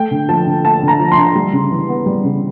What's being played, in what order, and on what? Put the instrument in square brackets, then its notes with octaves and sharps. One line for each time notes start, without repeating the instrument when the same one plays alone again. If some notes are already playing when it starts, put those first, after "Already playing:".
Already playing: [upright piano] A3 G5
D3
F3 A5
D3
A3 A5
D3
A#5
F3
C6
D3
G3
C#3
E3
B3
G3
C#3